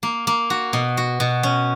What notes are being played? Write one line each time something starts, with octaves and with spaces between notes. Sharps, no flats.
A#3
A#3
F#4
B2
F#4
B2
C#4